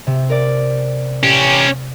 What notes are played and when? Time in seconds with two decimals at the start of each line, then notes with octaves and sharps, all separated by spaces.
0.07 C3
0.29 A#4 D5
1.23 C#4 G4